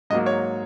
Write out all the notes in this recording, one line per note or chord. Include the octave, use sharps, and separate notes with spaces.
G#2 F#3 A#3 D#5
C#5